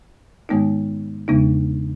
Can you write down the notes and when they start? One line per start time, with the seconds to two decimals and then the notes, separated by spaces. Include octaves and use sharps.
0.49 G#2 D#3 G#3 B3 D#4
1.28 E2 C#3 G#3 B3 D#4